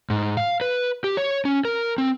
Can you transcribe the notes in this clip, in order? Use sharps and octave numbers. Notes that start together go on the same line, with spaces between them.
G#2
F5
B4
G4
C#5
C#4
A#4
C4